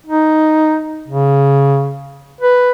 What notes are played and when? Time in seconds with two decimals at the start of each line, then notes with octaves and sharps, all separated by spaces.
0.07 D#4
1.08 C#3
2.41 B4